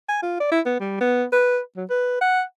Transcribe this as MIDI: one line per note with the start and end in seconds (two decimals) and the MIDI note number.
0.08 0.19 80
0.22 0.36 65
0.40 0.51 74
0.51 0.60 64
0.65 0.79 59
0.80 0.97 55
1.01 1.25 59
1.32 1.59 71
1.76 1.85 54
1.90 2.19 71
2.21 2.42 78